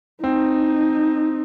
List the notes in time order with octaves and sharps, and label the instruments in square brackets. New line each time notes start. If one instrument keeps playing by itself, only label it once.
[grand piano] C4 [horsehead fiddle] D#4